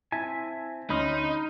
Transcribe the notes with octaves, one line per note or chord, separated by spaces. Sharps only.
C4 E4 E5 G#5 A5 G#6
D2 C#4 D#4 B5 C6 D#6 F6